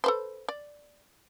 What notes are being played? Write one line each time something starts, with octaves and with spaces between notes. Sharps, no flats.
A4 B4 C5
D5